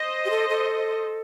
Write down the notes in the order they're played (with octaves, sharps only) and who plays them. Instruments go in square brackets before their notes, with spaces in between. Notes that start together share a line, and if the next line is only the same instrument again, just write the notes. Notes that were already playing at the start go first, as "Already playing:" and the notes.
Already playing: [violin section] C5 D#5
[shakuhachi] G4
A4
A4